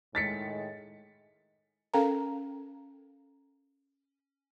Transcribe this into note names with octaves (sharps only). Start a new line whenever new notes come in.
A2 D#3 G#3 A6 B6 C#7
C#4 A4 A#4 F5 G5 A#5